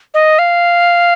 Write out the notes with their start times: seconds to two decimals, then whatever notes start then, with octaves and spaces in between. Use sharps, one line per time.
0.14 D#5
0.39 F5